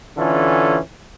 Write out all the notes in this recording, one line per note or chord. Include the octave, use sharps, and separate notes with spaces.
D3 E3 C#4 F4 A4